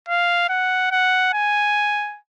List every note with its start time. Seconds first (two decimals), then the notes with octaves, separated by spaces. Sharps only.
0.08 F5
0.49 F#5
0.91 F#5
1.33 G#5